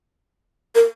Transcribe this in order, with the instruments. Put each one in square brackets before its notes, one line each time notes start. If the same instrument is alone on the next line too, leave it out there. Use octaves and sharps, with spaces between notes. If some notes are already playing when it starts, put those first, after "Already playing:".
[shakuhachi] A#4